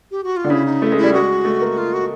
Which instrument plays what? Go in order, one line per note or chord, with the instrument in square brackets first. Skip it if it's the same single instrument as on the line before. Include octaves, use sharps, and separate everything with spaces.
[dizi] G4
F#4
F4
[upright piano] D3
[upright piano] C#3 [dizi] E4
[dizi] D#4
[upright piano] A3 [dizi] E4
[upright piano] G#3
[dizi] E4
[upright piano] G3
[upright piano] G#3 [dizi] F#4
[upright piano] A3
A#3
[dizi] F4
F#4